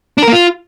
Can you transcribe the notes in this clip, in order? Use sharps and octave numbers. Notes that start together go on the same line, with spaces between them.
D4
A#4
A#3
F4